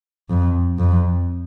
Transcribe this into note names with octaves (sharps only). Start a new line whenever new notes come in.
F2
F2